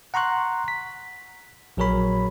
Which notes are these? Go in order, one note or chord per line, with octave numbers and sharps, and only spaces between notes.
F#5 A#5 C6 C#6 F#6
B6
A#1 F#3 G#4 A#4 C#5 B5